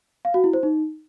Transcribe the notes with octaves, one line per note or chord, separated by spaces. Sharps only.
F5
F#4
E4
C5
D#4